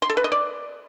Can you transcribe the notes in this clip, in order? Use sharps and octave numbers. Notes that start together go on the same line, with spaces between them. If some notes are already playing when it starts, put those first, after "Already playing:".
C6
A4
B4
D#5
D5